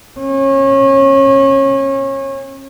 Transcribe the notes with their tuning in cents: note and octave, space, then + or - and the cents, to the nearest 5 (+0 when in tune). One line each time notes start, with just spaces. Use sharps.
C#4 -30